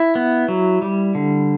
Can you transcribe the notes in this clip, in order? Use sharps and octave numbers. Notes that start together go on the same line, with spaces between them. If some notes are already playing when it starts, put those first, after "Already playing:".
Already playing: E4
B3
F#3
G3
D3